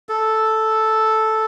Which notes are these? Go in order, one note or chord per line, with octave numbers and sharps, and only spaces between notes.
A4